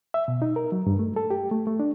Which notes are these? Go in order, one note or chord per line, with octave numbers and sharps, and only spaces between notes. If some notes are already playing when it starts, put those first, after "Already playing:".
E5
B2
D#4
A#4
F#3
G2
A3
A4
G4
A3
A3
D4